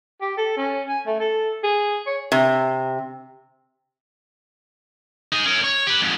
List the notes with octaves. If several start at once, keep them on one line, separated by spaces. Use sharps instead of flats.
G4
A4
C#4
G#5
A3
A4
G#4
C#5
C3
D#4 G#4
C#4 A#4
C#5
G4 B4
F2 G#2